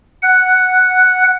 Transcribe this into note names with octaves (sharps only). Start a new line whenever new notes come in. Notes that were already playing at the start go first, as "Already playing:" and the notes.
F#5 F#6